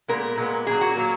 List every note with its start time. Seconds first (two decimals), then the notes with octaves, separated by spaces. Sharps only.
0.08 A#2 G#3 B3 A#4
0.37 A#2 G#3 B3
0.66 A#2 F#3 A#3 G#4
0.81 F#4
0.96 A#2 F#3 A#3